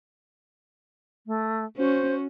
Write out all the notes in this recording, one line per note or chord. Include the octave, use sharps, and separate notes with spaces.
A3
C#4 F#4 C5